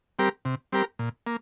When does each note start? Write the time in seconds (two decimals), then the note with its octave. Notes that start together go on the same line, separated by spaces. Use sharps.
0.19 G3 C4 G4 A#4
0.45 C3
0.72 G3 C4 G4 A#4
0.99 A#2
1.27 A#3